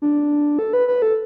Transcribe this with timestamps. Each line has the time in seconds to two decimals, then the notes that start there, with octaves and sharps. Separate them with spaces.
0.02 D4
0.59 A4
0.73 B4
0.88 B4
1.02 A4